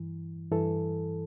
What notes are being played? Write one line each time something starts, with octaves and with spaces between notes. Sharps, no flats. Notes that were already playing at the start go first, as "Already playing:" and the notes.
Already playing: G2 E3
G2 E3 A4